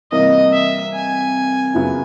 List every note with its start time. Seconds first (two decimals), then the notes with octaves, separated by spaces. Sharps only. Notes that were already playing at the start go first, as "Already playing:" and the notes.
0.12 C3 E3 G3 A#3 D#5
0.53 E5
0.94 G#5
1.74 F#2 C#3 F#3 B3 E4